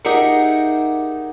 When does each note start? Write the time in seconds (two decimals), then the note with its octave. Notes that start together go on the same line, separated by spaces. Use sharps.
0.05 D#4 G4 G#4 A#4 E5 F#5